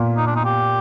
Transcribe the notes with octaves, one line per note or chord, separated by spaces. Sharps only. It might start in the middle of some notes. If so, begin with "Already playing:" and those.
Already playing: A#2
D#4
D4
D#4
G4